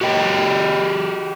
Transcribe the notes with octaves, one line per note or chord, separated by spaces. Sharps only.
F#4 G4 D#5 G5